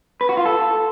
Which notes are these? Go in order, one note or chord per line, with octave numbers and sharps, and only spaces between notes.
B4
F#4
F4
A4